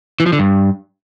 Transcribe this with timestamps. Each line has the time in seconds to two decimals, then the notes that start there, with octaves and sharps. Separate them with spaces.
0.20 E3
0.26 F3
0.33 D3
0.39 G2